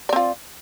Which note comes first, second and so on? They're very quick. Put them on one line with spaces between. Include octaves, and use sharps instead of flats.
D5 C4 F4